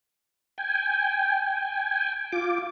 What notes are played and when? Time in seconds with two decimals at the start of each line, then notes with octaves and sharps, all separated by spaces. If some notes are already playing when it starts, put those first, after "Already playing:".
0.58 G5 G#5
2.32 F4 D6